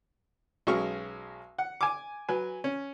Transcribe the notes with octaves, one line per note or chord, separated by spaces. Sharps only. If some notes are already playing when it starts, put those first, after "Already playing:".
B1 F#3 G#3 C#4 C#6 F6
F#5
G#5 D6
F#3 B4 G#5
C#4